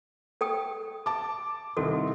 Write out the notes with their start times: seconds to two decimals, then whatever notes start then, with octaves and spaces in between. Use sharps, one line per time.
0.41 A4 G5 D#6
1.06 A5 D6
1.77 C2 D#3 F#4 A4